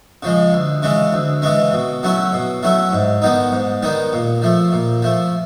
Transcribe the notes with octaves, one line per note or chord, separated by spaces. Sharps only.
C#3 F3 G#3
D2
C#3 E3 G#3 C#4
D2
C#3 E3 G#3 C#4
B2
F#3 A3 C#4 E4
B2
F#3 A3 C#4 E4
G#2
D#3 G3 B3 D#4
G#2
D#3 G3 B3 D#4
A#2
F3 A3
A#2
F3 A3